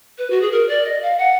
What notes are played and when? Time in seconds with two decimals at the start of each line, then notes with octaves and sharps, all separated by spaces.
0.18 B4
0.30 F#4
0.41 G#4
0.51 A#4
0.68 D5
0.84 D#5
1.02 F5
1.17 F#5